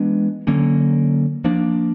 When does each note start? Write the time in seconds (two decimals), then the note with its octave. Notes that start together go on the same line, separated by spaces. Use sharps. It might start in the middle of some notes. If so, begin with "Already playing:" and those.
Already playing: E3 G#3 B3 D4
0.47 D3 F#3 A#3 C#4
1.44 F3 A#3 D4